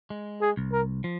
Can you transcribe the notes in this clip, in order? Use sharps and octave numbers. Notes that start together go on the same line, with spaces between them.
G#3
G#4
C2
A#4
F3